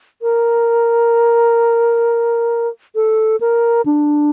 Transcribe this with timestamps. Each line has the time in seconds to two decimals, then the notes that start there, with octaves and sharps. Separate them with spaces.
0.22 A#4
2.95 A4
3.40 A#4
3.85 D4